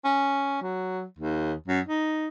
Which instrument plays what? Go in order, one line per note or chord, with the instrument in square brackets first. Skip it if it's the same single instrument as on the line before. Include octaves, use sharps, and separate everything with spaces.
[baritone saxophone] C#4
F#3
D#2
F#2
D#4